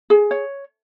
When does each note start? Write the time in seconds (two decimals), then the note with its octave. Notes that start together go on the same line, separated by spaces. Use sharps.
0.10 G#4
0.31 C#5